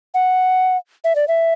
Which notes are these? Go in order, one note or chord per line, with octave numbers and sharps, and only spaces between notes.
F#5
E5
D5
E5